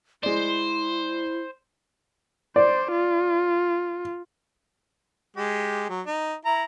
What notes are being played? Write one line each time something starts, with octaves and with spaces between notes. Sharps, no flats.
G#3 E4 C5 D5
C5 D5
F4
G#3 G4
F#3
D#4
E4 A#5